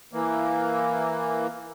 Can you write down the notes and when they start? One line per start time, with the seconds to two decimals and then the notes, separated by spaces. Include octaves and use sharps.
0.13 E3 A#3